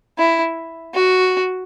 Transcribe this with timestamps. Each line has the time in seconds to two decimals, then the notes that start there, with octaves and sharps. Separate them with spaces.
0.18 E4
0.94 F#4